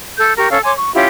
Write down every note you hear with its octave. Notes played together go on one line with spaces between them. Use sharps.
A4 G6
G4 A#4 C#6
C#4 A4 F5
C#5 G#5 C6 D6
C#6
C#4 E4 F4 G4